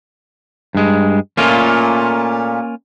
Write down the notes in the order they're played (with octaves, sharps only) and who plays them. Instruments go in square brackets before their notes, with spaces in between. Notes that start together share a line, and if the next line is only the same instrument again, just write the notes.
[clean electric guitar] G2 G#3
[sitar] A#2 A3 [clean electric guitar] A#3 C#4 F4